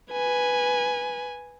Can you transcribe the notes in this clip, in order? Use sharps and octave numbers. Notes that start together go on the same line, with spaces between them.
B4 G#5